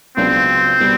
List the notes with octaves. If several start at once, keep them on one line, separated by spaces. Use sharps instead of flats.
C#2 C#3 F#3 B3 C4 D4
B2 G3 B3